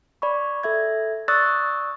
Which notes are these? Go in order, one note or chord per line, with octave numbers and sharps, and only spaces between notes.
D5 B5 C#6
A4 E5 G#6
D5 C#6 D#6 E6 F#6 A6